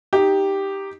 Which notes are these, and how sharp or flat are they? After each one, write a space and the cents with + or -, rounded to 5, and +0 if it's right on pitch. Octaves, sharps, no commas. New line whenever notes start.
D#4 +0 G4 +0